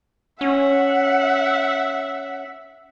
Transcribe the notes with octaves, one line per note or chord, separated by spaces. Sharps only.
C#4 E5 F#5